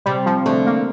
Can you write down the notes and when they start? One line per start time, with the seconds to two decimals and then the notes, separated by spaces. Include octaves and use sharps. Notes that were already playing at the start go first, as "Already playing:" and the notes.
0.06 C3 G3
0.26 F3
0.46 D3 A3
0.66 A#3